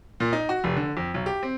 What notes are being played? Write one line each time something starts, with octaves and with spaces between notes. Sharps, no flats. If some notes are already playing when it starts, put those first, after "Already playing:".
A#2
D#4
F#4
F1
D3
F2
B1
G4
C4